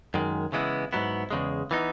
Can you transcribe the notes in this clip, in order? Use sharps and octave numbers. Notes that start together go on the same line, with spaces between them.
F#2 D#3 G#3
C#3 E3 G#3 B3 E4
G#2 F#3 B3 E4
E2 C#3 G#3
E3 B3 D#4